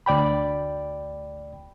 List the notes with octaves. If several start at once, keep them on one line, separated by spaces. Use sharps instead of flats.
D2 D5 G5 B5